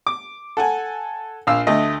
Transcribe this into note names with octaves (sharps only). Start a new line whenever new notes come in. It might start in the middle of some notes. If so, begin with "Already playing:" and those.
D6
A4 F#5 G#5
A#1 F5 E6
D2 A3 D#5